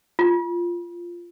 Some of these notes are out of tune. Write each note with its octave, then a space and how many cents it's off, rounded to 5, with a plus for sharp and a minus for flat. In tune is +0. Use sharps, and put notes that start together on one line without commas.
F4 -10